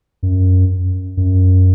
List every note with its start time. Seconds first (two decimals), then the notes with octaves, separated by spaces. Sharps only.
0.23 F#2
1.17 F#2